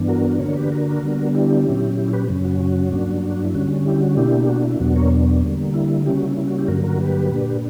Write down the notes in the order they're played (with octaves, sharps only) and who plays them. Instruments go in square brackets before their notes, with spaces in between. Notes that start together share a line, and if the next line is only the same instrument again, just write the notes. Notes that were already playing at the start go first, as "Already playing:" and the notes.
Already playing: [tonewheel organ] G2 E3 B3 D4
F#4 A#4
D3 A#3 D4 A#4 C#5
G4 B4
F#4 A#4
D3 G3 B3 D4
E4 G4
A#2 F#3 C#4
E4 G4
G4 B4
F#2 C#3 F#3 C#4
F#4
F#4
G2 F#3 A#3 D4
E4
D3 G3 C#4 F#4
E4 G4
F#4
B2 A#3 D4 E4 G4
G4
F#4
E4
E2 B2 F#3 B3 D4 F#4
A#4 C#5
D3 G3 A#3
E4
C#3 G3 A#3 C#4 E4 G4
F#4
E4
E4
F#4
E4 G4
G2 D3 F#3 A#3 F#4 A#4
F#4 A#4
G4 B4
A#2 A#3 D4